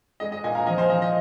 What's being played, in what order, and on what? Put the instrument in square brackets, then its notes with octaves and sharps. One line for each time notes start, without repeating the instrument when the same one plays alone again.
[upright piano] G#3 D#5
D#5
A#2 D#5 G#5
F5 A#5
F3 D#5 G#5
C5 F5
F3 D#5
D#5